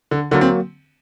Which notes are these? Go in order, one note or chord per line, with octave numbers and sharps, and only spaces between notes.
D3
D3 F#3 A#3 F#4
C4